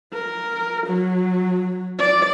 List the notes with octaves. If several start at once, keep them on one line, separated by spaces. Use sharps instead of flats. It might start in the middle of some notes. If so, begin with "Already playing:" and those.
A#4
F#3
D5